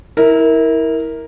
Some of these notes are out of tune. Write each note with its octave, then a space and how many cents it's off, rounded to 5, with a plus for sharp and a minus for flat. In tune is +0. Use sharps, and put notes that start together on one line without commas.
E4 -25 A#4 +0